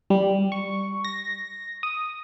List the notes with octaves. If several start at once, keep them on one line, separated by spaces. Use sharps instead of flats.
G3
C#6
A#6
D#6